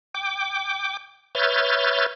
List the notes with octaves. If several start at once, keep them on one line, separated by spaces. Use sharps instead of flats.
G5 D6
B4 C#5 E5 F6 G6 A6